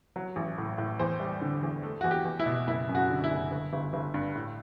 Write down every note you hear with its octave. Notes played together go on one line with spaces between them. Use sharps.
F#3
A1
A2
A2
E2 C5
G3
D3
E2
A3
E2 F#4
G4
E2
E4
B2
F#1 E4
F#2
F#4
D3
E4
F#1
G1
G1
G1
G2
A2